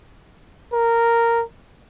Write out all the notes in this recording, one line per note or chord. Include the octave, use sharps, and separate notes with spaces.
A#4